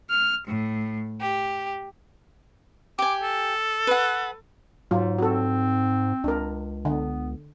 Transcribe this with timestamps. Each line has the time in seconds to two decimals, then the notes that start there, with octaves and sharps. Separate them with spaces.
0.10 F6
0.47 A2
1.21 G4
2.99 G4 G#5 D6
3.23 A4
3.87 B4 F#5
4.91 G#2 F#3 F4
5.18 C4 F#4 A4
6.24 C#2 D4 A#4
6.85 D3 B3